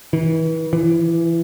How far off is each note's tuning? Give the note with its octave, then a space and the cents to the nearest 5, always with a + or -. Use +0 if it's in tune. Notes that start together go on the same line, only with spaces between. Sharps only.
E3 -35
E3 +20